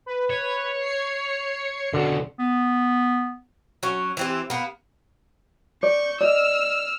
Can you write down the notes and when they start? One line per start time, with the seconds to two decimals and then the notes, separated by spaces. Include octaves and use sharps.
0.06 B4
0.30 C#5
0.81 C7 C#7
1.94 C#2 B2 D3 F#4
2.39 B3
3.83 F#3 C#4
4.17 E3 C4 G4
4.50 A#3 B3
5.83 D5 C#6 G6
6.21 D5 D#5 E6 F6